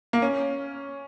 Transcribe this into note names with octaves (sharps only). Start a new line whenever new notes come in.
A#3
C#4